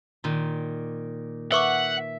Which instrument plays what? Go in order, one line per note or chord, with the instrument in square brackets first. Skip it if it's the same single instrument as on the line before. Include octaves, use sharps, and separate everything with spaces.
[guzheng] A#2 D#3
[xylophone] B4 C#6 D6 [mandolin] E5 [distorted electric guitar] F#5